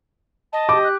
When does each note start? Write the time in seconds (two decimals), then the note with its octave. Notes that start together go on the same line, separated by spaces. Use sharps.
0.53 D#5 A5
0.69 G4 D6
0.84 F#6